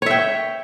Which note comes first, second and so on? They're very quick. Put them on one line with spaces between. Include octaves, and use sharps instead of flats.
C#5 E5 G5